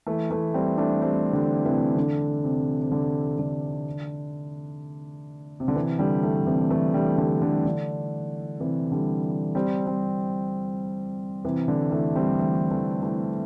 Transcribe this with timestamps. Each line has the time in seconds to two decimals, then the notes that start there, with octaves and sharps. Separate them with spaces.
0.07 E3 A3
0.30 E3 A3
0.54 G3 C4
0.78 A3 D4
1.01 G3 C4
1.33 D3 G3
1.65 C3 E3
1.97 D3
2.44 C3
2.82 C3
2.92 D3
3.39 D3
5.60 C3
5.68 D3
5.76 C3 E3
5.99 D3 G3
6.23 E3 A3
6.47 C3 E3
6.71 E3 A3
6.94 D3 G3
7.17 D3 G3
7.42 D3
7.65 D3
8.60 C3 E3
8.92 D3 G3
9.55 G3 C4
9.87 G3 C4
11.45 C3 E3
11.68 D3
11.92 E3 A3
12.16 G3 C4
12.39 E3 A3
12.71 E3 A3
13.02 E3 A3